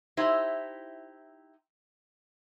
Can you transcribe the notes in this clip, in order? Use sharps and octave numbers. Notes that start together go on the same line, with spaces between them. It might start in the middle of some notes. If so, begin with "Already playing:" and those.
D#4 E4 G4 C5